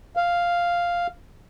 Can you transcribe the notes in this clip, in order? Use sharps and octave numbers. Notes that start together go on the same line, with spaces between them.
F5